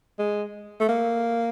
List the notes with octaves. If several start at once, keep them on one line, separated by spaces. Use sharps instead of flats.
G#3
A3
A#3